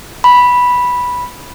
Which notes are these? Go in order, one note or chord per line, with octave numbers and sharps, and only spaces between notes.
B5